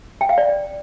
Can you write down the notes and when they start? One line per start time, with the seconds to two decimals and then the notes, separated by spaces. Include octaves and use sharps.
0.21 G5
0.29 F5
0.38 D5